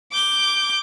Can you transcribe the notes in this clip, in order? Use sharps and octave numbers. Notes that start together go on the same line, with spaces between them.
D6 G6